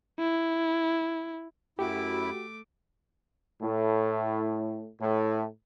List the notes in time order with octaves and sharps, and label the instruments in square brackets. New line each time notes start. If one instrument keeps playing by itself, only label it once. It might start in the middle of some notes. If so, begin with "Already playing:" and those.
[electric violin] E4
[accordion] F#2 E4 [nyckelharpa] A3 D6 [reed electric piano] F#4 G4
[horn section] A2
A2